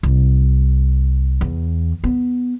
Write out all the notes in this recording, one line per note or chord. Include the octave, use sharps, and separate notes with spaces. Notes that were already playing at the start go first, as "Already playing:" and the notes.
C2
E2
B3